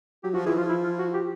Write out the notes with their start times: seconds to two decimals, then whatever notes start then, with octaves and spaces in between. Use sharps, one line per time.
0.24 F#3 G4
0.34 F3 F#4
0.46 E3 G#4
0.57 F3 F4
0.69 E4
0.84 F4
0.99 F#4
1.14 G4